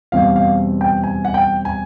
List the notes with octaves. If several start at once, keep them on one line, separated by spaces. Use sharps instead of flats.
E2 B2 G3 C4 F5
F5
G5
G#5
F#5
G5
G#5